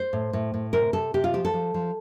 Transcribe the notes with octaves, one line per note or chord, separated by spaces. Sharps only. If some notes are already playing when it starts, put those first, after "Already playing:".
Already playing: C5
A2
A2
A2
C3 A#4
C3 A4
C3 G4
F4
F3 G4
A4
F3
F3